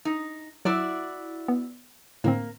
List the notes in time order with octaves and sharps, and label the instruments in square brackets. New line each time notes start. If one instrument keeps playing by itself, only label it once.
[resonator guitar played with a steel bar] D#4
[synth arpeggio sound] F#3 [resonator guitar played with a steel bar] E4 F#4 D5
[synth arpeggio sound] B3
[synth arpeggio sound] A2 D3 C4 [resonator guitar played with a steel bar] A#3